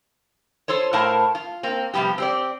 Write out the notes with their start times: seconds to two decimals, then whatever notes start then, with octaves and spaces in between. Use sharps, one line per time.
0.68 F4 A4 C5 C#5
0.93 A2 A#4 C5 F5 A5
1.35 F4
1.63 A#3 C4
1.94 C3 F3 G3 B3 G4
2.18 C4 G4 D5